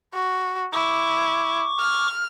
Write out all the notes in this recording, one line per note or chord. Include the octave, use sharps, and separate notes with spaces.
F#4
E4 C#6 D6
F6